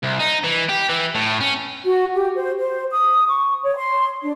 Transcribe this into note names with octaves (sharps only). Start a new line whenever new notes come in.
C2
D#4
E3
G4
E3
A2
C#4
F#4
G4
C5
C5
D#6
C#6
C#5
C6
D4